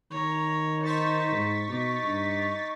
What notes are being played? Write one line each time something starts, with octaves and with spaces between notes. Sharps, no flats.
D#3 C#5 A#5
D#4 C5 C#6 A6 B6
G#2
B2 D#4 D6
G2